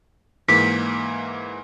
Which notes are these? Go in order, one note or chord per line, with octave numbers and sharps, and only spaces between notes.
G#2 E3 A#3 B6